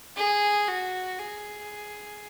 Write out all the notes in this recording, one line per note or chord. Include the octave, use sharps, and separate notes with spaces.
G#4
F#4
G#4